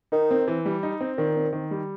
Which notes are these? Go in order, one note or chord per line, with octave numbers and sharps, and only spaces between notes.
D#3 D#4
C4
E3
G3
D#4
C4
A#2 D#3
C4
D#3
G3